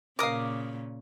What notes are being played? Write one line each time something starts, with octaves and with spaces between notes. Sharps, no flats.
A#2 C#3 A#4 F5 D6 D#6